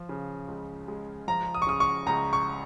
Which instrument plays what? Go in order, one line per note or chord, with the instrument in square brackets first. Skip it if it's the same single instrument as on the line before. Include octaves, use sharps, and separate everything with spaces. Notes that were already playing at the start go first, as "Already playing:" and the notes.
Already playing: [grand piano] F3
C#3
C#2
G#3
F3 A#5
D#6
C#6
C#3 D#6
C#6
C#2 A#5
C#6